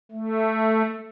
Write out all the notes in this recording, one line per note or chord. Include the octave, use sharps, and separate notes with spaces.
A3